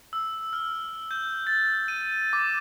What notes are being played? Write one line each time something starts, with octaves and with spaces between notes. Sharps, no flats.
E6
F6
G6
A6
D#7
D6